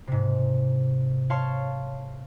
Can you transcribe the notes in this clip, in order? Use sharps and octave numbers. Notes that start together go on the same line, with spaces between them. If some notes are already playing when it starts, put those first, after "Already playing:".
G#2 C3
C#5 F5 A5 C6 C#6 F6